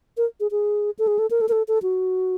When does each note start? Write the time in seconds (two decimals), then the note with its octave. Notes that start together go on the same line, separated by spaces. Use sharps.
0.17 A#4
0.40 G#4
0.51 G#4
0.99 A4
1.07 G#4
1.19 A4
1.31 A#4
1.41 A4
1.49 A#4
1.52 A4
1.68 A4
1.83 F#4